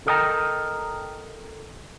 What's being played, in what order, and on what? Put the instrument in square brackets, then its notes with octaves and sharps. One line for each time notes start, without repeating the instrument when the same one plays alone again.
[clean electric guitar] A4 A#4 D#5 G5 A5 A#5